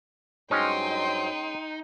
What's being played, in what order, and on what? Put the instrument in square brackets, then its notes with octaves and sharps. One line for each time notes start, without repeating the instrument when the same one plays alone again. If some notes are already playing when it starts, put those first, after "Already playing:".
[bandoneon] G2 F#3 C5 [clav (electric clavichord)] G#3 C#4 [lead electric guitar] D#4 [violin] G5 C6